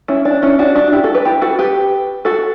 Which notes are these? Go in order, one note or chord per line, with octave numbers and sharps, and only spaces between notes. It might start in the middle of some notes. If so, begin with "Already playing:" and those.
C#4 E4
D4
C#4 E4
D4 F#4
D4 F#4
E4 G4
F#4 A4
G4 B4
E4 G4
F#4 A4
G4 B4
F#4 A4